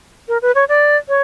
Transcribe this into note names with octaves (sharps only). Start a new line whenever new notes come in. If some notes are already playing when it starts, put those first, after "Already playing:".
A#4
B4
C#5
D5
C#5